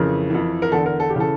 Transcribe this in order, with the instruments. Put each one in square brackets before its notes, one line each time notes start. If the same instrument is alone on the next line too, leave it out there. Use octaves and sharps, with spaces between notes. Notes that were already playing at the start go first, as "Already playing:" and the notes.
Already playing: [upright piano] F2 C#3 E3 A#4
F2 E3
A#4
E2 D3 A4
A#4
A4
G4
C#3 E3 A4